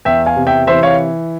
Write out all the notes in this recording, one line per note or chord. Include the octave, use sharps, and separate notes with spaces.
E2 E5 G5
F5 G#5
C3
E5 G5
E3 C5 E5
C#5 F5